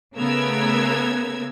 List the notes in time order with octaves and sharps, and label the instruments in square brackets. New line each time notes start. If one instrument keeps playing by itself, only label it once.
[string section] C#3 A3 B3 A#4 E6 G#6